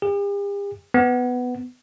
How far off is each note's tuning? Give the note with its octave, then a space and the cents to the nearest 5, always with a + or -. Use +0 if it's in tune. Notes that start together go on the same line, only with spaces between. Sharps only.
G4 +45
B3 +10